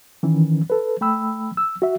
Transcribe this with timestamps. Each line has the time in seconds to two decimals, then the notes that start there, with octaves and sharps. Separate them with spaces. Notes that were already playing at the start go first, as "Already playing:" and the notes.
0.23 D#3 E3 C#4
0.70 A4 B4
1.01 A3 G5 B5 E6
1.57 E6
1.82 F#4 E5